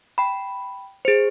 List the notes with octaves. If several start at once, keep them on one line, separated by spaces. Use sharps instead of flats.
G5 B5
G#4 C5